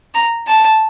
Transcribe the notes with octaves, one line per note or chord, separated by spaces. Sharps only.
A#5
A5